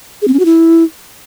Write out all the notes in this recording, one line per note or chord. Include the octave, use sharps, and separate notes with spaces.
G#4
C4
C#4
F#4
E4